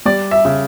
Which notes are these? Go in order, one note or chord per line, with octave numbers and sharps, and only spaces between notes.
G3 D5
E5
C#3